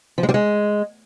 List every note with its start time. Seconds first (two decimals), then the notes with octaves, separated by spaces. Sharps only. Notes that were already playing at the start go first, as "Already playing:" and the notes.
0.18 F3
0.23 G#3
0.29 G3
0.34 G#3